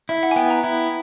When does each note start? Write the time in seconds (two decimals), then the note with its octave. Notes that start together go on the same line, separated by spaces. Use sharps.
0.09 E4 E5
0.23 F#5
0.31 G#5
0.36 B3 G5
0.50 A#5
0.64 E4